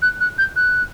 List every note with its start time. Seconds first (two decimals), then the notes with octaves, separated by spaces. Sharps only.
0.02 F#6
0.20 F#6
0.38 G6
0.56 F#6